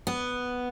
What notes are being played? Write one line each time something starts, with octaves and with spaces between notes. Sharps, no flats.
B3